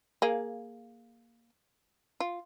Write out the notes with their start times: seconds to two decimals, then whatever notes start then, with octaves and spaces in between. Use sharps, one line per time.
0.22 A#3 G#4 F5
2.20 F4